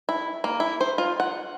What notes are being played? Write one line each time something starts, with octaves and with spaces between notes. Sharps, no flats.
E4
A#3
E4
C5
F4
F#5